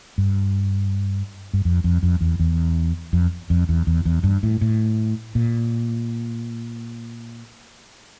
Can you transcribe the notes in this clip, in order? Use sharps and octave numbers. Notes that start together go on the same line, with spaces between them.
G2
G2
F2
F2
F2
E2
E2
F2
F2
E2
E2
E2
G2
A2
A2
A#2